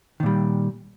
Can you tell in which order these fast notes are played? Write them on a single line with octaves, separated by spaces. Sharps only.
D#3 A#2 G3